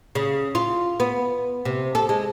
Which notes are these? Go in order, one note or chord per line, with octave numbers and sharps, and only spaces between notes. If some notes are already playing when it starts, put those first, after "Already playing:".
C#3
F4
B3
C3
A4
G#3